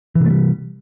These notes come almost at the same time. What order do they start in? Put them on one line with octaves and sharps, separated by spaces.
E3 C3 A3 G3